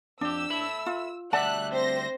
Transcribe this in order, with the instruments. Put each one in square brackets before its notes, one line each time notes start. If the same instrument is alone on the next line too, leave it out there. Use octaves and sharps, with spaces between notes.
[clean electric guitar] F2 G4 [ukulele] D4 [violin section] E6
[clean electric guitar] A4 E5 B5
[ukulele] F4
[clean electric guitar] D2 G3 E5 [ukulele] D5 F#5 A5 [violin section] F#6
[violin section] C4 C5 A#6